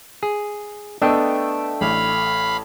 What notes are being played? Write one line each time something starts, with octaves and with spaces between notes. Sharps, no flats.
G#4
A3 B3 D4 D#5 E5 G5
A1 F5 B5